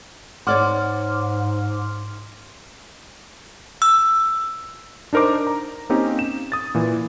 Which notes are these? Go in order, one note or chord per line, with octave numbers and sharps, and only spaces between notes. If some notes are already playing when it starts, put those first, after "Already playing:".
G#2 C#5 D5 F#5 C6 D6 F6
E6
D4 D#4 A#4 C5 D6
A#5
A#3 C4 C#4 D#4 G4
E7
D#6 A6
A#2 E3